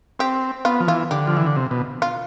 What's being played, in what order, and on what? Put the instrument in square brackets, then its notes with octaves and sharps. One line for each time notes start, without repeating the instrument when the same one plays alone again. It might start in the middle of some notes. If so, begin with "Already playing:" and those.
[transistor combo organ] C4 [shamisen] G4
[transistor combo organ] B3 [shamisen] F4
[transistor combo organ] F3
[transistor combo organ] E3 [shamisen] F4
[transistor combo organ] D3 [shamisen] G4
[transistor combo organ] F3
E3
D3
C3
B2
[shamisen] F4